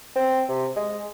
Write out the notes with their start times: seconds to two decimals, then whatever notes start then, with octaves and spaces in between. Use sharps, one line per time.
0.16 C4
0.49 C3
0.76 G#3